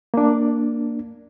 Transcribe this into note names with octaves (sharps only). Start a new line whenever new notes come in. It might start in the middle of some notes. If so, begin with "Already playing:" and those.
A#3 D4